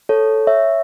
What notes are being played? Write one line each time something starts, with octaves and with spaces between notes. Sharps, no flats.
A4 C#5
C#5 E5